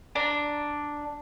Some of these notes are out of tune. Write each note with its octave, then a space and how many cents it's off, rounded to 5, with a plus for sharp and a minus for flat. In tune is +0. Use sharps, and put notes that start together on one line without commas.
D4 +0 A#5 +0